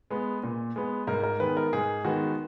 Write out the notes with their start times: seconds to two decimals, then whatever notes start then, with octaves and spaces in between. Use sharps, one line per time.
0.10 G#3 B3
0.44 A#2
0.76 G#3 B3
1.07 G#2 A#4
1.23 A#4
1.40 D#3 G#3 B3 B4
1.57 A#4
1.73 G#2 G#4
2.05 D#3 G#3 B3 F#4